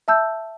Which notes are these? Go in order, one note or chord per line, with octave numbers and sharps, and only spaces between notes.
E5 A5 E6 G6